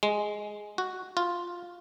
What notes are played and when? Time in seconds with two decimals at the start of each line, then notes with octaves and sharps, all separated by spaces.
0.03 G#3
0.78 F#4
1.17 F4